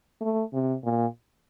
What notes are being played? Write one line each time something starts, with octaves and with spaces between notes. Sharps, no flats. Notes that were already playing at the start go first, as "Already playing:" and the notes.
A3
C3
A#2